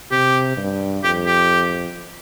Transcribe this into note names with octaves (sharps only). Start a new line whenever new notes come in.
C3 G4
G2
F2 G4
G4